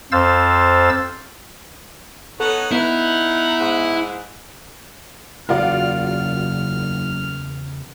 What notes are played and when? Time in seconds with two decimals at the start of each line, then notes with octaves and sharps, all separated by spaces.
0.12 F2 C5 F5 E6 A6
2.40 B3 D#4 A4 C#5 F#5
2.72 B3 D#4 E4 F#5
3.60 G#2
5.49 F#1 E2 C#3 F4 F#4 A#4 D5 F6